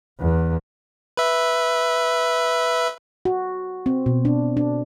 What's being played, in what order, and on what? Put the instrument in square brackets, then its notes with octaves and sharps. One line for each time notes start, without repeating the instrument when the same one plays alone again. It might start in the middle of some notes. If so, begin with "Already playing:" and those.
[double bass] E2
[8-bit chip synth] B4 E5
[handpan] F#4
C4
B2
D4
D4